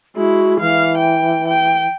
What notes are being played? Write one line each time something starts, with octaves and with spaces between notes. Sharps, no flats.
G#3 E4 F#4
E3 F5
G5
G5